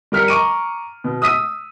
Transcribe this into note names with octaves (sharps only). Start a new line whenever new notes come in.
G3 A#4 F6 B6 C#7
A#5 C#6 D6 D7 D#7
B2
D#6 E6 B6 D#7